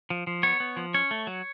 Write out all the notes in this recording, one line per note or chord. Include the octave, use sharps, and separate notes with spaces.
F3
F3
B3 C#5
B3
F3
C#4 C#5
A3
F#3